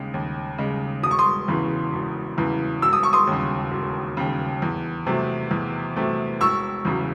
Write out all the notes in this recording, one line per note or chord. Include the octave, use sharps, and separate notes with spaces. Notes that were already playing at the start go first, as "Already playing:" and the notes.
Already playing: D#2 C#3 G#3
D#2
C#3 G#3
E1 D#6
C#6
C6 D#6
E2 C#3 E3
E1
E2 C#3 E3
E1 E6
D#6
C#6
C6 D#6
D#2 C#3
E1
D#2 C#3
E2
C3 F#3 A3
E2
C3 F#3 A3
E1 C#6 E6
E2 C#3 F#3